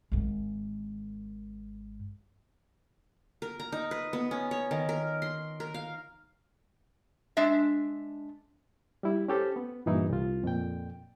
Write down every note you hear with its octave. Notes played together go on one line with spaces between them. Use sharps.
G#1 G#2
A#4
A#5
D#4
B4
B3
C#4
C#5
D#3
A#4
C6
A#4
F5
G#3 D4 E5
G3 E4
C#4 G4 A4 C5
B3
G2 A#2 E3 D#4 E4
C2 F4
F2 A#2 G5